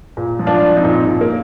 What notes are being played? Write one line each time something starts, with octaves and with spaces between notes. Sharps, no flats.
A#2
F3
D4 F4
F3
C4 D#4
A#2
A#2
A#3